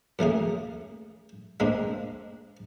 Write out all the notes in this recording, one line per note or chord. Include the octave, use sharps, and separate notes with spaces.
F#2 A3 A#3 G#4
G#3 A#3 C4 D4